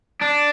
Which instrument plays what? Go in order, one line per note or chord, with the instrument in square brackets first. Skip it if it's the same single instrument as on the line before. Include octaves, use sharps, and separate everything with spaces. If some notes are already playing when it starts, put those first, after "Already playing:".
[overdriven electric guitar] D4